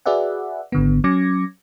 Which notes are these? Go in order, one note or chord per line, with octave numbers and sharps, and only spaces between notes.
F#4 G#4 B4 D5 E5 F#5
G#1 D3 B3
F#3 C#4 D6 G#6 A#6 C#7